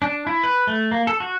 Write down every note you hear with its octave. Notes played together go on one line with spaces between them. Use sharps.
D4
E4
B4
A3
A#3
A4
F#4